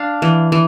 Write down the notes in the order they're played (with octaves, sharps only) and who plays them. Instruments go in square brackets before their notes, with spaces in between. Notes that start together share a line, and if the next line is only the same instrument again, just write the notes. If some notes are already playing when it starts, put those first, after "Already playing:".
Already playing: [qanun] D4 [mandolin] F5
[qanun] E3
E3